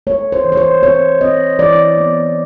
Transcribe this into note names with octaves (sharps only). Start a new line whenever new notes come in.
A3 C#5
C5
E3
C#5
C5
C4 C#5
C4 D#5
E3 D5
B3